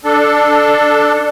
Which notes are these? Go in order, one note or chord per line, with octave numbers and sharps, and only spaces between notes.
D4 A4